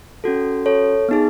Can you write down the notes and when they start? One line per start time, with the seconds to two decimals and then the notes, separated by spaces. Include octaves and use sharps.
0.24 C#4 F#4 A4
0.66 A4 C#5
1.09 B3 D#4 G#4